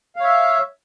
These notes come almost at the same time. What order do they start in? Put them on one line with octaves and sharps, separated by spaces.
F5 C#5 E5